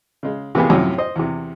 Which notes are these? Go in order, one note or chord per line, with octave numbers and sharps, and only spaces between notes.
C#3 G#3
C3 E3 A#3 B3 G4 G#4
F#2 A2 C3 F3
C5 D#5
E2 C3